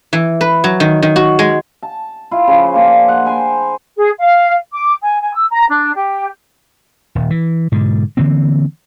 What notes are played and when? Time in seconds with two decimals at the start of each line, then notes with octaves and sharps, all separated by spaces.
0.13 E3
0.41 B4
0.64 F#3
0.80 D#3
1.02 D#3
1.16 F#4
1.39 G#3
1.83 A5
2.31 E4 F4
2.47 C#3 F3
2.74 A#3 D4
3.08 F#5
3.25 C5 G5 G#5 B5
3.96 G#4
4.18 F5
4.73 D6
5.02 G#5
5.20 G#5
5.33 E6
5.50 A#5
5.69 D4
5.95 G4
7.15 D#1
7.30 E3
7.72 G#2 B2 D3
8.17 D3 E3 A#3 C4